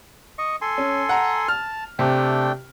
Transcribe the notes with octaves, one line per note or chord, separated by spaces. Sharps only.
D#5 C#6
A4 G#5 C6
C#4
F#5 A#5
A5 F6
C3 A3 D4 G5